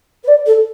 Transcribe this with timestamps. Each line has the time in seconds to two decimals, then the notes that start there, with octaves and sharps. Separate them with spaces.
0.23 B4
0.27 D5
0.46 A4